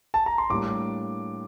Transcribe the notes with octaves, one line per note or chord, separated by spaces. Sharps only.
A5
A#5
C6
A2 G3 A#3 D4 D6